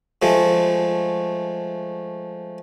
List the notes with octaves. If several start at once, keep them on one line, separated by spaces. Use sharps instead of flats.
F3 G#3 A3